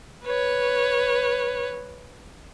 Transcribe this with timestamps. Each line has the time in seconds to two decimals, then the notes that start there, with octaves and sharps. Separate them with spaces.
0.24 B4 C#5